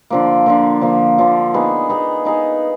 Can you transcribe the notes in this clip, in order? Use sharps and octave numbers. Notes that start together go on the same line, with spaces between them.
D3 F3 A#3
D3 F3 A#3
D3 F3 A#3
D3 F3 A#3
B3 D#4 G#4
B3 D#4 G#4
B3 D#4 G#4